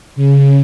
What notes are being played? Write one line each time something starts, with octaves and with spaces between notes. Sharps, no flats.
C#3